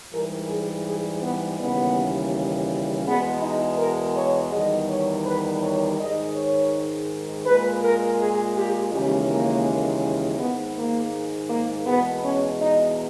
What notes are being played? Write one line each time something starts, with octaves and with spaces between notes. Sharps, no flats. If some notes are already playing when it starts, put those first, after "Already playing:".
G#2 E3 G3 A#4
G#4
G#4
B3
D#2 C#3 E3 G3 B3
E2 B2 G#3 B3
D#4
A#4
C#5
E2 D#3 G3 D#5
C#5
B4
C#5
G#2 D#3 G#3 D#5
C#5
A#2 G#3 B4
A#4
G#4
G4
D#2 C#3 E3 G#3 G4
A#3
G#2 D#3 G#3 B3
A#3
A#3
E2 B2 G#3 B3
C#4
D#4